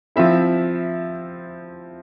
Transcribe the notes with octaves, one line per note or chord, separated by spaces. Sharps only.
F3 C4 E4 E5